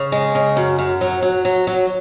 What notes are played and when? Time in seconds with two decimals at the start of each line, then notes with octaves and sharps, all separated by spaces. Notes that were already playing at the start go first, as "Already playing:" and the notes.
Already playing: C#3
0.12 G#3
0.35 C#3
0.57 F#2
0.78 F#2
1.01 F#3
1.22 F#3
1.45 F#3
1.67 F#3